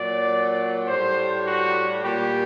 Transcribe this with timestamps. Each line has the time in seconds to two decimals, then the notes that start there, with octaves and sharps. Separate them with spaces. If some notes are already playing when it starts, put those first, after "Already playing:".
Already playing: A#2 F#3 D5
0.87 A2 G3 C5
1.45 F#4
2.03 A#2 G3 G4